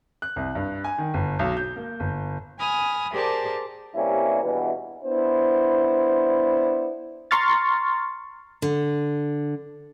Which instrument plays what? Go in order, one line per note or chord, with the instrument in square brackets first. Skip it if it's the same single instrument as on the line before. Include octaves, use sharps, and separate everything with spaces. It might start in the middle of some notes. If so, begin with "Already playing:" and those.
[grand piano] F#6
C2
G2
G#5
D#3
G1
B1
G6
A#3
G1
[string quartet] G#5 B5 D#6 F6
G4 G#4 A#4 C5 D5 A5
[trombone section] G2 C3 G3 A#3 C#4 E4
E2 G2 B2 E3
[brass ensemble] B3 D4 E4 C5
[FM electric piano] A#5 C6 C#6 F6 A6
[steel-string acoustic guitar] D3